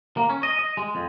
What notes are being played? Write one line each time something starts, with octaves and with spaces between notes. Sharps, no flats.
A#3
C#4
D#5
D#5
G#3
F2